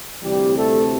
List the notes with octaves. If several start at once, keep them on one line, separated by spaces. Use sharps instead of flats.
D2 C3 E3 G3 G4
A3 A4